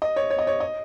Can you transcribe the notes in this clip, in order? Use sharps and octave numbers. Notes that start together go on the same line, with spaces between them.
D#5
C#5
C#5
D#5
C#5
D#5